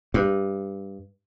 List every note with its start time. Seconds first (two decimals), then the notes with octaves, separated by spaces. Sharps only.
0.14 G2